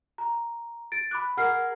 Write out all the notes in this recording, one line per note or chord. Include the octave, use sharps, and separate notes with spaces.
A#5
A6 D7
B5 D6 F#6
G#4 A#4 F#5 F6 C7